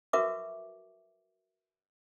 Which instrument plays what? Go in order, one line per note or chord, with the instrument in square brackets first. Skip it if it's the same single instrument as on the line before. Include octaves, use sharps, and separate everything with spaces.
[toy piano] F#4 A#4 B4 E5 C#6 D6